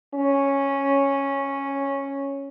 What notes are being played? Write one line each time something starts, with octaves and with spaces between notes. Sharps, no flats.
C#4